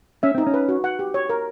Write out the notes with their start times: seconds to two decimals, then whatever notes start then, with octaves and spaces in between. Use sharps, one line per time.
0.23 C#4 E5
0.35 C4 D#4
0.47 C#4
0.54 B4
0.69 F#4
0.84 F#5
0.99 G4
1.14 C#5
1.29 A#4